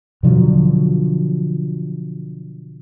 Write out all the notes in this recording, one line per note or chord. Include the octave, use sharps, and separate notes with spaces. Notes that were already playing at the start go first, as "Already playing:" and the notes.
B2 D3 F3 F#3